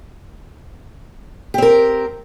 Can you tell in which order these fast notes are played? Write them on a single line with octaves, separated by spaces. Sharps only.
G4 C4 A#4